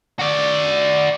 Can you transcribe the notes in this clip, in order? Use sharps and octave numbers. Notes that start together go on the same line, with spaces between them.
F#4 D5